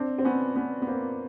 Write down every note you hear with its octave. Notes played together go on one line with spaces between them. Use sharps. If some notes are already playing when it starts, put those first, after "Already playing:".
Already playing: C4 D4
C4
B3 C#4
B3 C#4
B3
A#3 C4